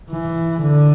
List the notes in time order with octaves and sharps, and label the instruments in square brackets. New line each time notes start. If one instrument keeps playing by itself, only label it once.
[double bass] E3
D3